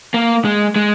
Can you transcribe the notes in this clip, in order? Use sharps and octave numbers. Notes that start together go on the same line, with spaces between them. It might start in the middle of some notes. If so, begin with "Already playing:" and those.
A#3
G#3
G#3